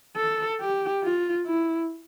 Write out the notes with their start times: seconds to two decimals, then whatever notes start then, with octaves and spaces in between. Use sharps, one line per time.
0.16 A4
0.61 G4
1.03 F4
1.46 E4